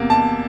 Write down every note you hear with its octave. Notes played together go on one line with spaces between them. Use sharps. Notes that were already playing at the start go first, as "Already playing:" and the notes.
Already playing: E2 C3 A#3
A5